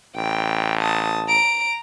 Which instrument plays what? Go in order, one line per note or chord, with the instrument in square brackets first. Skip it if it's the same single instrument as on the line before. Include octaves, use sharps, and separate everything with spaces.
[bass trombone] A1 [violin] G5
[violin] A5 D#6
A#5 D7